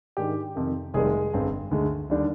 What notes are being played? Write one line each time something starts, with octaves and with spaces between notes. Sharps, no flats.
G#2 D#3 G#3 D4 G4
F2 C3 D#3
F1 F2 D#3 G3 G#3 G#4
G1 G2 D3 G#3 C4
D2 D3 G#3
D#2 D3 G3 D4